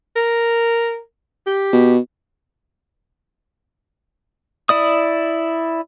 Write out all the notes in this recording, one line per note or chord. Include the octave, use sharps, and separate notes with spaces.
A#4
G4
B2
E4 D5 D#6